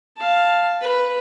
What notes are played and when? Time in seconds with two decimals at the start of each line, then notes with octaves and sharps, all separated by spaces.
0.17 F5 A5
0.82 B4